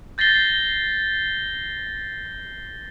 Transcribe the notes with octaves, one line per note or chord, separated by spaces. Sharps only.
G6 A6 A#6 C7 G7